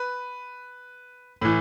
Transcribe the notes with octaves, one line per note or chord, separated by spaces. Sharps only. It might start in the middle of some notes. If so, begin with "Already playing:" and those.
Already playing: B4
A2 E3